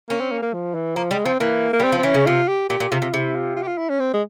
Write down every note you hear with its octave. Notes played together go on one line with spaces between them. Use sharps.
A#3 C#4
C4
A#3
A#3
F3
E3
F3 A#3
G3 G#3
F3 C4
E3 A#3
A#3
G3 C4
F3
C4
E3 C#4
C#3
C3 F4
G4
A#2 G4
A#2
C3 F4
C3
C3 E4
F4
F4
G4
F4
E4
C#4
C4
G#3